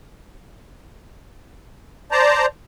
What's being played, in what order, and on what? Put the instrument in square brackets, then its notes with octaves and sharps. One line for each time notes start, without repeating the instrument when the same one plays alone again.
[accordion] C5 D5 A5 A#5